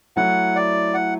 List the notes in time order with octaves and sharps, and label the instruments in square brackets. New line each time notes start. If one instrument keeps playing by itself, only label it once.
[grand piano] F#3 A3 E4 [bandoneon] F#5
[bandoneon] D5
F#5